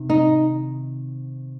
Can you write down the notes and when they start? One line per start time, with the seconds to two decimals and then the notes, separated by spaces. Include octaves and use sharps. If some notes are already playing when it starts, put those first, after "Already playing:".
Already playing: C3 D#3 C4
0.10 D#4